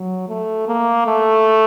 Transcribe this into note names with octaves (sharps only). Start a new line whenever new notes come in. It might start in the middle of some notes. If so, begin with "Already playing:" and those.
Already playing: F#3
A3
A#3
A3